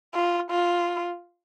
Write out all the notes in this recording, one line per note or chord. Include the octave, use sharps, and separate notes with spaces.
F4
F4